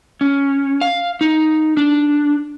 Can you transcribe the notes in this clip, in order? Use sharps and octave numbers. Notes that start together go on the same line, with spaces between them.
C#4
F5
D#4
D4